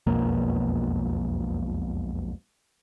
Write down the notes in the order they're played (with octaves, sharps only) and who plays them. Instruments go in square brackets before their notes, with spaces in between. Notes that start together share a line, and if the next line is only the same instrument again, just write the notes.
[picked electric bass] E1 B1 F2 A#3